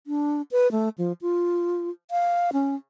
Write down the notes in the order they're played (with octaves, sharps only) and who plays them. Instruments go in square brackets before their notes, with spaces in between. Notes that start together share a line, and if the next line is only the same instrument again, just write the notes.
[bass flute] D4
B4
A3
F3
F4
F5
C#4